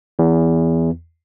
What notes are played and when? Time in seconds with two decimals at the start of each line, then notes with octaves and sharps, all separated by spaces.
0.19 E2